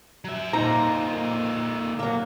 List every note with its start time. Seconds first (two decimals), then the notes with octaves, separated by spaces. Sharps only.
0.25 F#3 E5
0.53 A#2 D3 A#3 D#4 C5 A#5
1.99 F#3 A#3